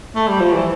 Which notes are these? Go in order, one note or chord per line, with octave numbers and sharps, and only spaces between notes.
A3
G3
F3
E3